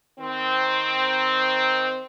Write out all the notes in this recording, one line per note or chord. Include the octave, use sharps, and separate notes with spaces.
D#3 C4